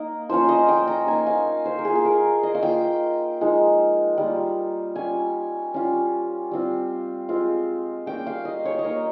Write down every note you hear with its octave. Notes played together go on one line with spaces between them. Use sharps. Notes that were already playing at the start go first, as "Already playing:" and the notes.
Already playing: A#3 D#4 A#4
F3 A#3 C#4 F4 C5
D#5
G5
A#5
A#3 D#4 G#5
F5
C5
A#4
A#3 F4 G#4
G#4
A#4
D#5
F5
A#3 F4 G5
F3 G#3 D#4
G3 A#3 F4
G3 C#4 F4 G#5
G3 C#4 F4
G3 C4 F4
G#3 C4 F4
G3 A#3 C#4 G5
F5
D#5
C#5
D#5
A#3 D#4 C#5